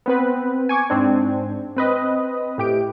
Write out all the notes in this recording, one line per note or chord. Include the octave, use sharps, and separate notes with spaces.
B3 C4 B4
G#5 C#6 D6 G#6
G#2 C4 D4
C4 B4 D#5
A2 G4 D7